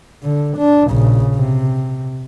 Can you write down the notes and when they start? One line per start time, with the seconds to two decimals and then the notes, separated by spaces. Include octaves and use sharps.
0.23 D3
0.58 D4
0.90 A#1 C#3
1.35 C3